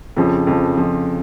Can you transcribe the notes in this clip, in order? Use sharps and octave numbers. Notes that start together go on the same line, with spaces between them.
F2 C#3 F3
F2 C#3 F3
F2 C#3 F3